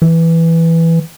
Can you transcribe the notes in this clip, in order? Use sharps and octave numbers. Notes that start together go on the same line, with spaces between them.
E3